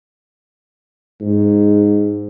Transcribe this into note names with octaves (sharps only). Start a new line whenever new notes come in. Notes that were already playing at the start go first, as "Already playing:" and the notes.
G#2